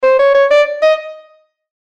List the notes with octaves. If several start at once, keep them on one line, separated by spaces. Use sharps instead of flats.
C5
C#5
C#5
D5
D#5